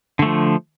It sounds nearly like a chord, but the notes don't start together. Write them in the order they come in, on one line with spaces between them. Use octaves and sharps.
D3 A3 F3